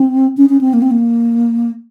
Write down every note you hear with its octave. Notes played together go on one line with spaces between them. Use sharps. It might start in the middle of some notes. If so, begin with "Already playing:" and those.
Already playing: C4
C#4
C#4
C4
A#3
C4
A#3